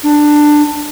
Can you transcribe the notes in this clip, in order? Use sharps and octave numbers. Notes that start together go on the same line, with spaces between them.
D4